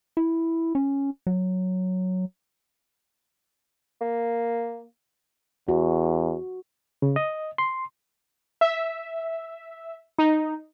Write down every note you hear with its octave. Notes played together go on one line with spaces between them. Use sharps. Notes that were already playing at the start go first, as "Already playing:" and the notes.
E4
C#4
F#3
A#3
E2 F#4
C#3
D#5
C6
E5
D#4